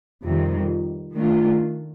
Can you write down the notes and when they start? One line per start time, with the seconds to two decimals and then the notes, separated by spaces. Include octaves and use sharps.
0.23 F2 C3 D#3 G3
1.14 D#3 A3 D4 F4